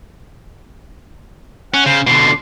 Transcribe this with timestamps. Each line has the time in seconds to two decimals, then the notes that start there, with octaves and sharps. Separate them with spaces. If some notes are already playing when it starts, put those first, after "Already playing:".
1.74 C#4 F#5
1.86 C#3 C5
2.07 B2 D3 C6